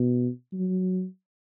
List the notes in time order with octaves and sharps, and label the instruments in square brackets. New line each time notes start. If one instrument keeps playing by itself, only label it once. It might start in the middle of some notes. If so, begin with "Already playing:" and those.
Already playing: [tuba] B2
F#3